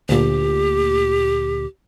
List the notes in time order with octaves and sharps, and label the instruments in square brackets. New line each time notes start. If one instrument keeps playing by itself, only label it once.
[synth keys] D2 A#2 [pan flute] G4